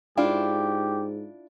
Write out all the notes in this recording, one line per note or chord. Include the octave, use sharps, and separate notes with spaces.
G#2 D4 E4 F4 G4